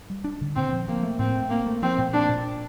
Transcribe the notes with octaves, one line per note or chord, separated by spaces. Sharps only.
G3
D4
D3
A#2 C4
F3
F3 A#3
A3
A2 C4
A3
A#3 C4
A3
F3 C4
A#2
A#3 D4
A#2